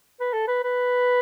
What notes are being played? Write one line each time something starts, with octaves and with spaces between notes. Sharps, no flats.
B4
A4
B4
B4